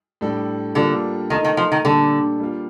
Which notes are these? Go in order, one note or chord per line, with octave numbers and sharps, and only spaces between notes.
A2 G3 D4 A4
D3 G3 A#3 D4 F4 A4
D#3 A3 D#4 A#4
D#3
F3
D#3
A#2 D3 G3 D4 A4
G3 A#3 F4